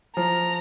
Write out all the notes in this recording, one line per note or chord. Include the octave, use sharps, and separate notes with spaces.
F3 A#5